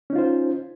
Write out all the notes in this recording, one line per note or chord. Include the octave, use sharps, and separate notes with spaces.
C#4 D#4 F4 C5